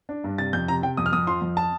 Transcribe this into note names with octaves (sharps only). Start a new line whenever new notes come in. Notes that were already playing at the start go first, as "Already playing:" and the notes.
D4
G2
C3 A6
F2 G6
C3 A#5
C3 G5
F2 D#6
F6
F2 D#6
F3 C6
F2
A5